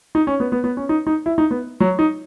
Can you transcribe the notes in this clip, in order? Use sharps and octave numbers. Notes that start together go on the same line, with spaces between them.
D#4
C#4
B3
B3
B3
C#4
D#4
D#4
E4
D#4
B3
F#3
D#4